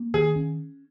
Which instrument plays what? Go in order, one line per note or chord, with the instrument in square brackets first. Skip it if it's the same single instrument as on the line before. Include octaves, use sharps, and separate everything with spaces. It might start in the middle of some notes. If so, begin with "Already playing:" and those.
Already playing: [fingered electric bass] A#3
[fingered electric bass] D#3 [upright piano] G#4
[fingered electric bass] C#4